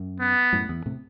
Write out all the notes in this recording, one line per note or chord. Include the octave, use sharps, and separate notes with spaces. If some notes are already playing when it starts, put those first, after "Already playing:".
Already playing: F#2
B3
F#2 A2
E2
A2 C3